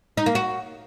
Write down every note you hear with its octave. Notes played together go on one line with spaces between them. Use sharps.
D#4
A#3
F#4